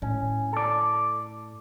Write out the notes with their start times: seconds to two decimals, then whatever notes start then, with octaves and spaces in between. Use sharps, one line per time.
0.02 A2 C#4
0.53 A4 D5